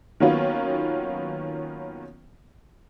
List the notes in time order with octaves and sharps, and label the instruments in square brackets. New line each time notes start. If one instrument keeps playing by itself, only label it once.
[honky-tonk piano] D#3 F#3 A#3 B3 C#4 F4